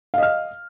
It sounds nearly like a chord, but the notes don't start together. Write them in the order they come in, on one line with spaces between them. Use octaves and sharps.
F5 D#5 F6